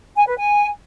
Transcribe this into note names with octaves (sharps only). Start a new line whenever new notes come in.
G#5
B4
G#5